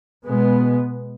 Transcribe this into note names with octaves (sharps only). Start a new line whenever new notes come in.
B2 G#3 B3